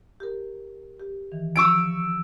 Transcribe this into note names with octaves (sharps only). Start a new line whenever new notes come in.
G4 A#4
G4
D#3 E3
F3 C#6 E6 D7